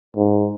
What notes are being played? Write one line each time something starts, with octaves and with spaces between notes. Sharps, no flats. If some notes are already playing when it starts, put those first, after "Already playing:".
G#2